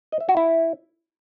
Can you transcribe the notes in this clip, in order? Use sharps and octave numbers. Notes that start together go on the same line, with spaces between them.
D#5
E5
F#4
E4